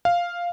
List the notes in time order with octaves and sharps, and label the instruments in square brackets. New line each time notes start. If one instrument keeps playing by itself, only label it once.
[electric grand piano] F5